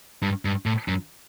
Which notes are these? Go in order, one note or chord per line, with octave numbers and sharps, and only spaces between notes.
G2
G2
A2
F#2